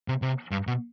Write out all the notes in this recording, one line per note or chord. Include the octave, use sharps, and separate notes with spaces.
C3
C3
G2
B2